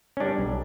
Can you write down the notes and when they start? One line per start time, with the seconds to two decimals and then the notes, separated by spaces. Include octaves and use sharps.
0.17 C#4
0.20 G3 D4
0.38 B1